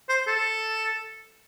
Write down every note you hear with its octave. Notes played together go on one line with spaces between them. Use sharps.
C5
A4